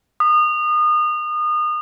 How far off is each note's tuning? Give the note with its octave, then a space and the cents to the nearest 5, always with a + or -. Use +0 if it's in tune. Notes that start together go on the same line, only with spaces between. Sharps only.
D#6 -30